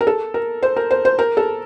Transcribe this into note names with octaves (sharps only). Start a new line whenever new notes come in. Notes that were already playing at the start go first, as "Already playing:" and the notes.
A#4
A4
A#4
C5
A#4
C5
C5
A#4
A4